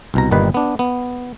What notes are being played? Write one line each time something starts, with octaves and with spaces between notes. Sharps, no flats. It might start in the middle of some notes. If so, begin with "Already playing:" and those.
C2 B2 A#5
G1 A#2 D#3 G3 D#4 B4
B3 D4
B3